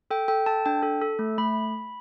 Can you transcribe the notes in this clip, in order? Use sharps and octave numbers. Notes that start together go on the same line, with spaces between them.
A4 G5
A4 G5
A4 A5
D4 G5
A4
A4
A3
A3 B5